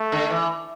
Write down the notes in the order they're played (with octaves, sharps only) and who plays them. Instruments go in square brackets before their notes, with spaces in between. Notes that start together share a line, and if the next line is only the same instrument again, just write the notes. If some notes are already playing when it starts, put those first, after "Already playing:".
Already playing: [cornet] A3
[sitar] D3
E3